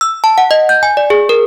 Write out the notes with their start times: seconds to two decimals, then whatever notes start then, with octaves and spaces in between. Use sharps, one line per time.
0.01 E6
0.24 A5
0.38 F#5
0.51 D#5
0.69 G6
0.83 G#5
0.97 D5
1.10 G#4
1.29 A#4